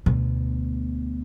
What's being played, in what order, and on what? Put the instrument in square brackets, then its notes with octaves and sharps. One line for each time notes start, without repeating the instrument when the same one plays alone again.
[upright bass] D2 B2